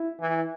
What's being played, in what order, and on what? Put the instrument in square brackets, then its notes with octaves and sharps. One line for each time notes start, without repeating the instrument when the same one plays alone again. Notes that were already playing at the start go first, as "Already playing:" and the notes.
Already playing: [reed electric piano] E4
[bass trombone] E3